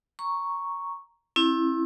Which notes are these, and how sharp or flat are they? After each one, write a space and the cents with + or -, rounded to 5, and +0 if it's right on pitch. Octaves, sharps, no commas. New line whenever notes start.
A#5 +0 C#6 +0
C4 +45 E4 +0